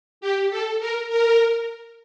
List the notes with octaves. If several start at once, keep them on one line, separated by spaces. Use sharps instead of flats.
G4
A4
A#4
A#4